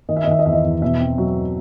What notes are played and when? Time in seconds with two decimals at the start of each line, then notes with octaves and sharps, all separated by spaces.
0.09 D#3 D#5
0.17 E5
0.24 D#5
0.27 D#3 E5
0.39 D#5
0.46 E2 E5
0.53 D#5
0.64 E2
0.82 B2 E5
1.00 C4
1.18 F#3